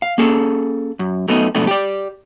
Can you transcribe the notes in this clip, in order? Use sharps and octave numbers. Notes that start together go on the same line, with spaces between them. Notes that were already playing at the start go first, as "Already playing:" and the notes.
F5
A#3 C#4 G#4 A4
F#2
F#2 A3 B3 D4 D#4
F2 G#2 B2 A3 B3 D4
G4 D5